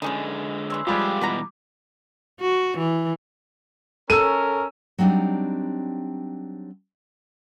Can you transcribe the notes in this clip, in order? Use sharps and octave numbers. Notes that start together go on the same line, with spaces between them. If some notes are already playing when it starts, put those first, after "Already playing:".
D3 E3 G#3 C#4 D#4
E3 C#5 C6 E6
F3 G3 G#3 F4 G4 D6
B2 E3 B4 F#5 A#5
F#4
E3
C#4 A4 A#4 E6 D#7
F#3 G3 C4 D4 D#4